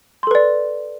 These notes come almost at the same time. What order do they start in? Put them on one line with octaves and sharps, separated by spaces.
C6 A4 B4 D5